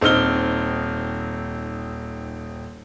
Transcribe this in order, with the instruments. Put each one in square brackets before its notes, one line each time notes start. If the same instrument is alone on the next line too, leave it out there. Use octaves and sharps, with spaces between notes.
[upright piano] D#1 C4 D#4 F6 G7